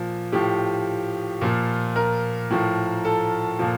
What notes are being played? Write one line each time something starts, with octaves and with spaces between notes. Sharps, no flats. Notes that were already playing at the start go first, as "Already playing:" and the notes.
Already playing: A#2 F3
A2 F3 G4
A#2 F3
A#4
A2 F3
A4
A#2 F3